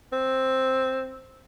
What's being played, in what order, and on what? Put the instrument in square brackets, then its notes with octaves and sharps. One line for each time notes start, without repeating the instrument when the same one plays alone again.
[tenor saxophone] C4